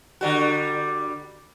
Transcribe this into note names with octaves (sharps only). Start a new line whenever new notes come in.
D3 G3 F#4